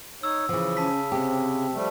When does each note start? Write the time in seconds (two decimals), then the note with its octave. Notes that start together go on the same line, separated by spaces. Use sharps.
0.23 D#4 C#5 E6
0.49 C#3 E3 F3
0.77 C#4 A5 B6
1.12 C3 C4 G4
1.73 F3 G3 A3